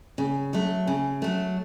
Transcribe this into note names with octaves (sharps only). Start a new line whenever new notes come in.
C#3
F#3 A3
C#3
F#3 A3